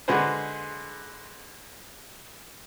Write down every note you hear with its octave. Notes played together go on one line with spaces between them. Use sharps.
D3 G#3 F#4 G#4 B4 C5